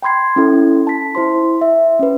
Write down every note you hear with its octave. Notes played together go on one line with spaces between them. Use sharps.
G5 B5 C6 G#6 C7
C#4 E4 A4
A5 B6
E4 C5 C6
E5
C#4 B4